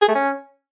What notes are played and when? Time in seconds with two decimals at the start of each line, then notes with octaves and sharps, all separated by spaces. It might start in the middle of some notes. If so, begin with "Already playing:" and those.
0.02 G#4
0.08 A3
0.15 C#4